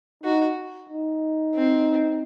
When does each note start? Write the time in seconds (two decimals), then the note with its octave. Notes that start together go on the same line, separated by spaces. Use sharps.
0.24 D#4 F#4
0.90 D#4
1.55 C4